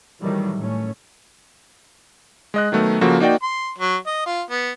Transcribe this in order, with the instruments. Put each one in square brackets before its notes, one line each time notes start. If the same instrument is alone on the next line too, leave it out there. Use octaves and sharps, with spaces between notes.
[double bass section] A2 D#3 E3 F#3 G3 A3
A2 A3 C#4
[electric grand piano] G#3 D#5 F#6
D#3 F#3 A3 B3
C#3 F3 A#3 F#4 A4
A#3 D#4 F#4 D5 G5
[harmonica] C6
F#3
D#5
F4
B3